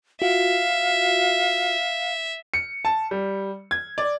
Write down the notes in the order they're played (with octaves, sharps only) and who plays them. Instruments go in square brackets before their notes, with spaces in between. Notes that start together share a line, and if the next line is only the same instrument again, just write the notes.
[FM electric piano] F4 F#4 [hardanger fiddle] E5 [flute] F5
[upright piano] C#7
A5
G3
G#6
D5